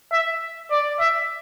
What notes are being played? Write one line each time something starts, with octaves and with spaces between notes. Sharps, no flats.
E5
D5
E5